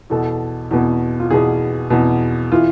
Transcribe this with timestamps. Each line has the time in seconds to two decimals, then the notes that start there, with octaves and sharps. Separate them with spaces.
0.10 E2 B2 A4
0.71 E2 B2
1.20 F4
1.31 E2 B2 G#4
1.90 E2 B2
2.52 E3 F4